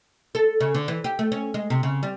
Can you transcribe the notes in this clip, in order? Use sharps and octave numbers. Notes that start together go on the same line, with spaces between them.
A4
C#3
D3
E3
G4
A3
C#4
G#3
C3
C#3
G3